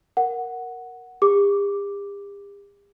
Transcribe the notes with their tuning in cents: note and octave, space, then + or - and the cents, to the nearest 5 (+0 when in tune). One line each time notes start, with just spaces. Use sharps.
A#4 +0 F#5 +0
G4 +45 D6 +0